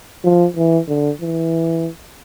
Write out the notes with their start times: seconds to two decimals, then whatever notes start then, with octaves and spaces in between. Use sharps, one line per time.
0.24 F3
0.57 E3
0.88 D3
1.21 E3